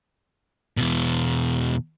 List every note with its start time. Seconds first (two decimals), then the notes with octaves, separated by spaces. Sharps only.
0.77 E2 B2